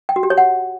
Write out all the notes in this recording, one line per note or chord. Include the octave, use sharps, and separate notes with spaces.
G5
F#4
G4
C#5
F#5